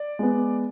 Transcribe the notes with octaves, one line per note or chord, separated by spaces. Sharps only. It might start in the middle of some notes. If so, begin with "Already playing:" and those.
Already playing: D5
G#3 B3